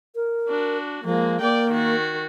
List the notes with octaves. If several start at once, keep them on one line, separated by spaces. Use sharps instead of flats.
A#4
D4 F#4
F3 G#3 A#3
A#3 D5 G5
D#3 F#4